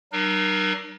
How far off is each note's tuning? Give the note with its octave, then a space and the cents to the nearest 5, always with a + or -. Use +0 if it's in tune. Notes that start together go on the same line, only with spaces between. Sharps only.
F#3 +45 D#4 -45 A#4 +25